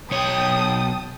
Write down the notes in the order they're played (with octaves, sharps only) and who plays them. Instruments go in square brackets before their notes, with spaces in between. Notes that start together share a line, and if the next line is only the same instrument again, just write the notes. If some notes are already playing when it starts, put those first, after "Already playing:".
[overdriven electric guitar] B1 C#5 [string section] G5 A5 D#6